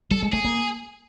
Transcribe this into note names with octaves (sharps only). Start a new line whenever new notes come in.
G3 A4
G#3
A3 G#4
A#3